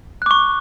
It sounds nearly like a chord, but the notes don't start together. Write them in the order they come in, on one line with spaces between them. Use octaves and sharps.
F#6 D6 C#6